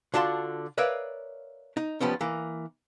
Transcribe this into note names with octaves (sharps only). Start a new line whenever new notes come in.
D3 D4 F4 F#4 A5 C6
A#4 B4 C#5 D5 E5 F5
D#4
D#2 F3 G3 B3 C#4
E3 A#3